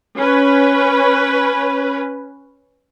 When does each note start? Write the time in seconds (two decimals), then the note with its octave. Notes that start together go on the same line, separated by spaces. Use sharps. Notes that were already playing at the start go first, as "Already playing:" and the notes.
0.17 C#4 B4